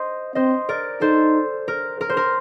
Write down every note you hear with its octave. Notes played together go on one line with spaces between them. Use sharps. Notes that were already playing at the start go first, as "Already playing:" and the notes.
Already playing: C5 D#5
C4 C5 D#5
A#4 D5
D#4 A4 C5
A#4
A#4
C5
A#4